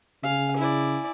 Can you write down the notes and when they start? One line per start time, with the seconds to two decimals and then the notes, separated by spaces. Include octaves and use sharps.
0.23 C#3 F5 G#5
0.57 E4 D5